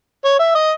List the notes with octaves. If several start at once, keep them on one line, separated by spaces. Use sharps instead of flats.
C#5
E5
D#5